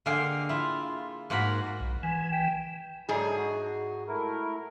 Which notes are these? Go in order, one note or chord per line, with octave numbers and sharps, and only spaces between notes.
D3 A#3 G#4 F5 G5 C6
E4 F4
G#2 A#3 F#4 A#4 B5
B1
E3 G#5
G5
G#2 F#3 D4 E4 G#4
F#4
A3 E4 A#4